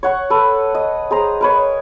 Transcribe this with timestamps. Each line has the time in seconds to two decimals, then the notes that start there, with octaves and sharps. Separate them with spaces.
0.03 C#5 F#5 C#6
0.30 A4 B4
0.75 D#5
1.11 G#4 C5 A#5
1.41 A#4 B4 C#5